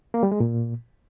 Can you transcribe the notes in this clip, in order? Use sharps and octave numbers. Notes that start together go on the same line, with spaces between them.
A#3
G3
G#3
A#2